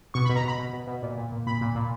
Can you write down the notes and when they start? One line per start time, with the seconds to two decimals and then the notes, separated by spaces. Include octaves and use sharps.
0.14 B2 C#6
0.25 B2 B5
0.36 A#5
0.44 B2 B5
0.59 B2
0.73 B2
0.87 B2
1.02 A#2
1.17 A#2
1.32 A#2
1.47 A#2 B5
1.61 A#2
1.75 A#2